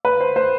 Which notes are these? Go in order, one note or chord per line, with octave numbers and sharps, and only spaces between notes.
B4
C5
C5